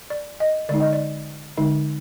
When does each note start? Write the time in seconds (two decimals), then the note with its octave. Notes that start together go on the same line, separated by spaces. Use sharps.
0.10 D5
0.40 D#5
0.69 D3 G#3 D#4 D5
0.80 D#5
0.93 D5
1.57 D3 G#3 D#4